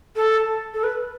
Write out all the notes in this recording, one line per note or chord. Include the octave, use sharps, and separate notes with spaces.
A4
A4
B4